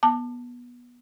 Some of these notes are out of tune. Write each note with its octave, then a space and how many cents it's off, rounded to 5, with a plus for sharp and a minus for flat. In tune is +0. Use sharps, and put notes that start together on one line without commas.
B3 -20 A5 +10 D6 +30